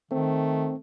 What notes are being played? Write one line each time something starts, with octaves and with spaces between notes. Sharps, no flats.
D#3 A3 C4